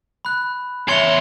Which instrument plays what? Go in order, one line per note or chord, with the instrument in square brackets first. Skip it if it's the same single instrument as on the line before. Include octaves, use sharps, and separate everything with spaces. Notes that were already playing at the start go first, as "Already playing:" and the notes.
[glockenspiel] B5 F#6
[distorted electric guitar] E2 C6 [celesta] C#5 E5 [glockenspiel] G#6 C#7 F7